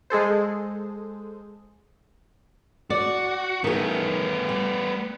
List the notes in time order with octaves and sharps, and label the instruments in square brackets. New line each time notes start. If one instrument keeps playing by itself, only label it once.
[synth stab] G#3 G#4 A4 C5
[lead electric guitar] F#4 [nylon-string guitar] D5
[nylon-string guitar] D#3 G#4 [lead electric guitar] A3 B3
[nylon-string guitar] G3